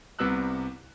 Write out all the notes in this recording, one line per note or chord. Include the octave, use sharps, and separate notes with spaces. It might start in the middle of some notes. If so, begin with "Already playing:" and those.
C2 C3 G3 B3 E6 F#6